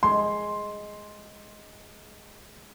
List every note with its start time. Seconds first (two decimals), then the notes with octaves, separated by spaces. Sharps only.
0.03 G#3 C6